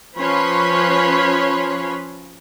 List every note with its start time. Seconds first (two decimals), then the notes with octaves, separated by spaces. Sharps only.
0.17 F3 C#4 B4 C#5 B5 C6